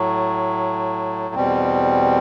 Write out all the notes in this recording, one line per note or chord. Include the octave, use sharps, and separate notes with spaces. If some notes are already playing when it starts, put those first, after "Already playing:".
Already playing: A2 F#3 A3
E2 B2 G3 C4